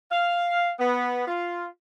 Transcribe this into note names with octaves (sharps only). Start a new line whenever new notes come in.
F5
B3
F4